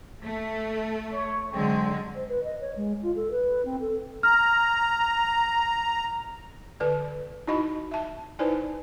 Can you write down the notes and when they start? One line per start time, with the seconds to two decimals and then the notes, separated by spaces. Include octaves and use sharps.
0.23 A3
1.12 C#5
1.53 D3 F#3 G#3 C4
2.15 C5
2.29 B4
2.44 D#5
2.61 C#5
2.76 G#3
3.03 F4
3.16 A4
3.31 B4
3.65 C4
3.81 A4
4.23 A#5 F6
6.80 D3 B4 D5
7.48 D#4 E4 F#4 D#5 B5
7.91 E5 A5
8.39 D#4 E4 B4 C5 D5 G#5